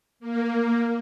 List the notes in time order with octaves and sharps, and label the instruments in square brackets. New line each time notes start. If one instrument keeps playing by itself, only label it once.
[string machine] A#3